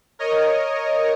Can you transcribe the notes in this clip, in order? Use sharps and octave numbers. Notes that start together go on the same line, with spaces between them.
A#4 C#5 D#5